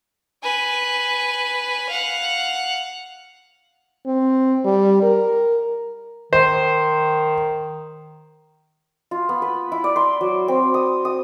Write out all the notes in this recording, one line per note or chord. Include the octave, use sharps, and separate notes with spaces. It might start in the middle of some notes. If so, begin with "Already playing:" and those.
B4 G#5
F5 F#5
C4
G3
A#4
D#3 C5
F4
B3
B4
E4
D5
C6
F#3
C4
D#6
D#6